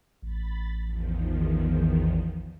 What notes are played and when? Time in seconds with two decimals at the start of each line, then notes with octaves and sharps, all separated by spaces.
0.22 A1 B5 A6
0.85 E2 D#3 F3